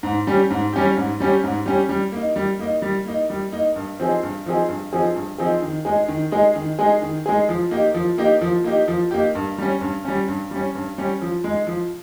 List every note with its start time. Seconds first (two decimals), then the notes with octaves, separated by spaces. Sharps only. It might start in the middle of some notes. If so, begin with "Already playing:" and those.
0.03 G#2
0.27 G3 C#4 G4
0.50 G#2
0.73 G3 C#4 G4
0.97 G#2
1.20 G3 C#4 G4
1.44 G#2
1.66 G3 C#4 G4
1.89 G3
2.12 A#3 D#4
2.36 G3
2.59 A#3 D#4
2.82 G3
3.06 A#3 D#4
3.30 G3
3.52 A#3 D#4
3.76 G2
4.00 F3 C4 D#4 G#4
4.23 G2
4.46 F3 C4 D#4 G#4
4.69 G2
4.93 F3 C4 D#4 G#4
5.15 G2
5.38 F3 C4 D#4 G#4
5.62 D#3
5.85 G#3 D#4 G#4
6.08 D#3
6.31 G#3 D#4 G#4
6.55 D#3
6.79 G#3 D#4 G#4
7.02 D#3
7.26 G#3 D#4 G#4
7.49 F3
7.71 A#3 D#4 G4
7.94 F3
8.18 A#3 D#4 G4
8.41 F3
8.64 A#3 D#4 G4
8.88 F3
9.11 A#3 D#4 G4
9.35 G2
9.58 G3 C#4
9.81 G2
10.05 G3 C#4
10.28 G2
10.51 G3 C#4
10.75 G2
10.98 G3 C#4
11.21 F3
11.44 G#3 D#4
11.67 F3